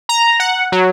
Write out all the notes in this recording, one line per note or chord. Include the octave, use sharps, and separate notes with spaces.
A#5
F#5
F#3